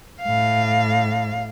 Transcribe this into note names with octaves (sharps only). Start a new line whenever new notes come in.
A2 F5